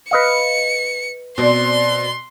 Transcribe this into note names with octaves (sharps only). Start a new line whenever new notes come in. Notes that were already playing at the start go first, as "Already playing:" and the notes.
B4 D#5 F5 C#7
B2 C4 C5 D5 C6